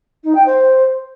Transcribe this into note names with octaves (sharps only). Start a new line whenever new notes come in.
D#4
G5
C5